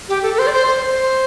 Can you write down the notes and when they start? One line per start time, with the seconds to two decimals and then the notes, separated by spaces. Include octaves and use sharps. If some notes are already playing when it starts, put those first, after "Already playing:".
0.09 G4
0.23 A4
0.34 A4
0.39 C5
0.47 D5
0.53 C5
0.68 C5
0.82 C5